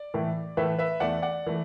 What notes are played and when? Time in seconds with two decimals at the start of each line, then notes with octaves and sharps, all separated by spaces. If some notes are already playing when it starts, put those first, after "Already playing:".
Already playing: D5
0.14 A2 E3 A3
0.57 A2 E3 A3 B4 E5
0.79 B4 E5
1.00 E2 E3 A3 D5 F#5
1.22 D5 F#5
1.46 E3 A3